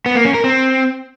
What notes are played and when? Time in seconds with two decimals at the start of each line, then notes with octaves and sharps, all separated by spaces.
0.06 B3
0.15 A#3
0.25 C#4
0.34 A#4
0.44 C4